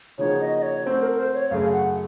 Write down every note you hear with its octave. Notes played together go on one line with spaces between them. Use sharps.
C#3 F3 A#3 D#4 F#4 C#5
D#5
D#5
C#5
A3 C4 F#4 C5
A#4
A#4
C5
C#5
F#2 C#3 A3 F5
F#5